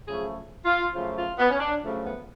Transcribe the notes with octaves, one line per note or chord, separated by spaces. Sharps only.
F#2 C#3 F3 A3 G#4
F4
F#2 C#3 F3 A3 F4
F4
B3
C#4
D4
F#2 C#3 F3 A3
B3